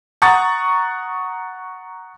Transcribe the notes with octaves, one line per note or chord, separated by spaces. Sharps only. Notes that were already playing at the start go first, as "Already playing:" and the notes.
F#5 A#5 C#6 D#6 F#6 A6